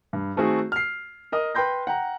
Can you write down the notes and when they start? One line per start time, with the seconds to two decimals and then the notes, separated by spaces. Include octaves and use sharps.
0.13 G2
0.36 D#3 A3 C4 F#4 G#4 A4
0.72 F6 C7
1.32 A#4 D#5 D#6
1.55 B4 G5 C6 G6 A#6
1.87 F#5 G5 A#5